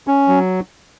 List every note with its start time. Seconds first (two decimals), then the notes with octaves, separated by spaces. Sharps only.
0.07 C#4
0.28 F#3